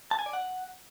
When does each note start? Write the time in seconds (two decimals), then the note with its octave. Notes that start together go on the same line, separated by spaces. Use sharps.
0.11 A5
0.19 G#5
0.26 D5
0.33 F#5